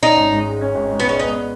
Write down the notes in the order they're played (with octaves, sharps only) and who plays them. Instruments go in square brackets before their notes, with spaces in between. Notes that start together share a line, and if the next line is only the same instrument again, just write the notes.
[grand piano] C#4 [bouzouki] D#4
[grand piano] G#1
G#2
G#3
C#4
G#1
G#2
[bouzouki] B3
[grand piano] G#3 [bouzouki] C#4
[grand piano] B3 [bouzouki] D#4